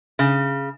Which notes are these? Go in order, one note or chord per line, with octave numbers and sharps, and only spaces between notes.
C#3